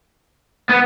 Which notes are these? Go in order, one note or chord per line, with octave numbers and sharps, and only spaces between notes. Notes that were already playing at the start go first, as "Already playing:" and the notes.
B3